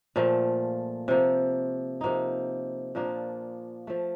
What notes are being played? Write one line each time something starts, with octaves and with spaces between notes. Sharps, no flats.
A#2 F3 A3
C3 F3 A#3
C3 F3 A#3 D#4
A#2 F3 A#3 D4
F3 A3